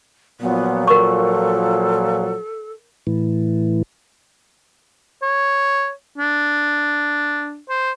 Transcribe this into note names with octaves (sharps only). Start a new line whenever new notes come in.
A#2 F3 F#3 B3
A4 A#4 C#6
A2 E3
C#5
D4
C5